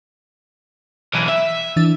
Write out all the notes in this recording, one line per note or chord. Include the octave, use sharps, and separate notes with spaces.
B1 E3
E5
E3 D4 A6